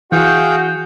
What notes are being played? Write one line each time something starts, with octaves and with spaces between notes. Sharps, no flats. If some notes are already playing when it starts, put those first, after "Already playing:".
E3 F#4 G#4 F5 G5 G6